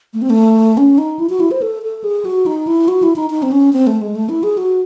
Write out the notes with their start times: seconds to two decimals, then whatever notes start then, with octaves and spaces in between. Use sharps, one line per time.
0.14 A3
0.22 C4
0.30 A3
0.77 C#4
0.98 D#4
1.19 E4
1.30 F#4
1.40 E4
1.51 C5
1.62 A4
1.83 A4
2.04 G#4
2.25 F#4
2.46 D#4
2.67 E4
2.88 F#4
3.03 E4
3.16 D#4
3.30 D#4
3.43 C4
3.52 C#4
3.73 C4
3.87 A3
4.01 G#3
4.15 A3
4.29 E4
4.43 G#4
4.58 F#4